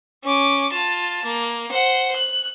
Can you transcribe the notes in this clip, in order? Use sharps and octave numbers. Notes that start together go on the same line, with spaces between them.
C#4 D6
F4 A5
A#3
C5 F#5
F#6